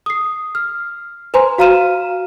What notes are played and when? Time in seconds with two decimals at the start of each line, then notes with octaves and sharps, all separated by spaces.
0.06 D#6 C7
0.55 F6
1.34 B4 C5 G#5 A#5 C6
1.58 F#4 F5 A#5 F6 D#7 E7